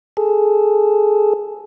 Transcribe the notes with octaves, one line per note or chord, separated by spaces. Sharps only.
G#4 A4